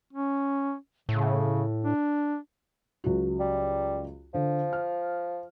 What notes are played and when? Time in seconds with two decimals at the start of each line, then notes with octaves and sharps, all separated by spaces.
0.13 C#4
1.09 A2 C#3
1.85 D4
3.04 C#2 F#3 F#4
3.40 G3
4.34 D3 F3
4.73 F6